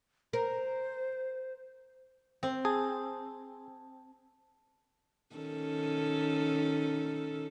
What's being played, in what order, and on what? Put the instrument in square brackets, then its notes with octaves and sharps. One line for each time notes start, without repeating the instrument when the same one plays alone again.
[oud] A#4 [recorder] C5
[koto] C4
[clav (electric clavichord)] G#4 [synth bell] A5
[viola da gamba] D#3 C#4 A4